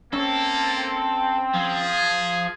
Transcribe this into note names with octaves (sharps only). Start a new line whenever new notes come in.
A#3 C4 C#4 A4
F3 G#4